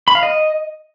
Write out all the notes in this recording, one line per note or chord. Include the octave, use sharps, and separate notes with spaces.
B5
F5
D#5